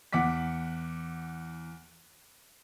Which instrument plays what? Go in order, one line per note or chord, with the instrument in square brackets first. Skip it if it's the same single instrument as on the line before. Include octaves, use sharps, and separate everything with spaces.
[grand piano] E2 F#5 D6 B6